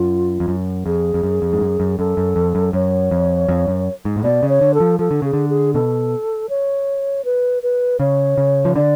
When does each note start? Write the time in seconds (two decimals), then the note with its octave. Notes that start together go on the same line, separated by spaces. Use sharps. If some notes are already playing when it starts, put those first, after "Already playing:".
Already playing: F#2 F4
0.40 F2
0.48 F#2
0.86 F2 G#4
1.14 F2
1.23 F#2
1.42 F2
1.53 G#2
1.61 F#2
1.80 F#2
1.99 F#2 A4
2.17 F#2
2.36 F2
2.55 F#2
2.73 F#2 C#5
3.11 F2
3.49 F2
3.68 F#2
4.05 G#2
4.16 A2
4.24 B2 D5
4.43 C#3
4.49 C#5
4.61 D3
4.74 A4
4.80 F3
4.99 F3 A4
5.11 D3
5.22 C#3 G#4
5.33 D3
5.50 G#4
5.74 B2 A4
6.49 C#5
7.25 B4
7.63 B4
8.00 C#3 C#5
8.38 C#3
8.65 F3
8.75 D3 D5